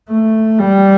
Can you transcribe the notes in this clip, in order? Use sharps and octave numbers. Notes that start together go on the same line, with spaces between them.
A3
G3